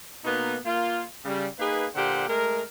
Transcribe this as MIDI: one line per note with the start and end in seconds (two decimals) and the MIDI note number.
0.25 0.56 47
0.25 0.56 58
0.25 0.56 59
0.25 0.56 63
0.65 1.05 58
0.65 1.05 65
1.25 1.47 49
1.25 1.47 55
1.59 1.87 58
1.59 1.87 63
1.59 1.87 68
1.59 1.87 71
1.95 2.26 46
1.95 2.26 50
1.95 2.26 67
1.95 2.26 72
1.95 2.26 78
2.28 2.62 56
2.28 2.62 57
2.28 2.62 70